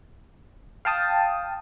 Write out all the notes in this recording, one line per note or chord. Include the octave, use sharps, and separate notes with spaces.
F5 G5 A5 D#6